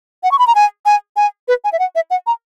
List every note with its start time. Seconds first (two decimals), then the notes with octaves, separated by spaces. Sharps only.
0.23 F#5
0.32 C#6
0.39 B5
0.47 A#5
0.55 G#5
0.86 G#5
1.17 G#5
1.48 B4
1.64 G#5
1.73 E5
1.79 F#5
1.96 E5
2.10 F#5
2.27 A#5